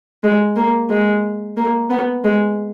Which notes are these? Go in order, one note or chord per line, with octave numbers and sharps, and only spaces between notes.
G#3
A#3
G#3
A#3
B3
G#3